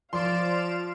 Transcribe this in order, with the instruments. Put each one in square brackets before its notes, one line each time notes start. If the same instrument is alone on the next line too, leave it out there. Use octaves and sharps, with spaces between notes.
[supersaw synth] F3 D7 E7 [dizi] D5 [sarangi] F5 [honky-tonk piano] C6